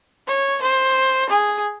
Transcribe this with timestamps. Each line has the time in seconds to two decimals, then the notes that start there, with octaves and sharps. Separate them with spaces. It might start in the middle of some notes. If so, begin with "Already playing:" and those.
0.27 C#5
0.62 C5
1.29 G#4